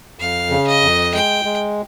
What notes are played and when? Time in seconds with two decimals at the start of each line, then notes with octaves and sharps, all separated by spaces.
0.19 F2 F5
0.50 C#3
0.67 D#5
0.82 F2
1.13 G#3 G5
1.45 G#3